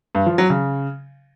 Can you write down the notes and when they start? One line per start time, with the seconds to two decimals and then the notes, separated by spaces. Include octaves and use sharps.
0.15 G2
0.26 F3
0.38 F#3
0.50 C#3